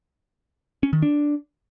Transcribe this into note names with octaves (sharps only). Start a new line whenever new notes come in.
C#4
D#3
D4